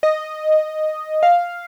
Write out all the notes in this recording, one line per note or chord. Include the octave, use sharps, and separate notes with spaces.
D#5
F5